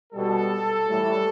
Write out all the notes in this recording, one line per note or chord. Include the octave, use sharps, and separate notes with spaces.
B2 G3 A4
A2 E3 G3